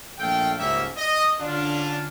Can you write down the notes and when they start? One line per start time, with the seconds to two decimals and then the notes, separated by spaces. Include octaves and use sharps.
0.19 A#1 A3 A4 F5 G5
0.59 C#2 G#2 G3 A#3 C#5 E5
0.97 D#5
1.41 D3 C#4 D4 F4